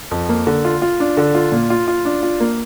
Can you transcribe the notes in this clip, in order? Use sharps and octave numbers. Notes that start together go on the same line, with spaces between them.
F2
A#3
D3
F4
F4
D4
D3
F4
A#2
F4
F4
D4
F4
A#3